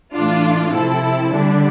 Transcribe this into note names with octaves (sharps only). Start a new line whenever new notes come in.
A2 E3 A3 D4 F4
C3 F3 C4 E4 A4
D3 G3 D4